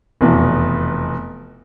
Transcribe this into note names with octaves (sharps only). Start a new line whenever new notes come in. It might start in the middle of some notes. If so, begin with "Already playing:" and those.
F1 E2 B2